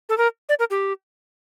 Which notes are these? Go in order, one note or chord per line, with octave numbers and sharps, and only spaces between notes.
A4
A#4
D5
A#4
G4